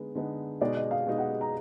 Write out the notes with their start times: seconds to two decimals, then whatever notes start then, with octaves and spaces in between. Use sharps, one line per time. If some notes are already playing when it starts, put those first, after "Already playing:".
Already playing: D3 G#3 B3 D#4
0.15 D3 G#3 B3 D#4
0.61 B2 G#3 D#4 D5
0.77 D#5
0.91 F5
1.07 B2 G#3 D#4
1.18 F#5
1.41 A#5